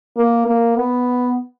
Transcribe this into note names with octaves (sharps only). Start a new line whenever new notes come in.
A#3
A#3
B3